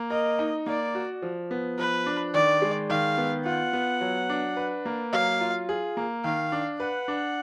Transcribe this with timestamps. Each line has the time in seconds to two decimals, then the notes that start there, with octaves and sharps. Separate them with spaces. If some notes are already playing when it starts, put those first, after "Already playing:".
Already playing: A#3
0.10 A#4 D#5
0.39 D#4
0.66 A#3 D5
0.95 F#4
1.22 F3
1.51 B3
1.78 F3 B4
2.06 D4
2.34 D#3 D5
2.62 G#3
2.89 D#3 F5
3.18 B3
3.45 F4 F#5
3.73 B3
4.01 F#3
4.30 D4
4.57 B4
4.85 A#3
5.13 F#3 F5
5.41 F4
5.69 G#4
5.97 A#3
6.24 D#3 F5
6.52 D4
6.80 B4 F#5
7.08 D4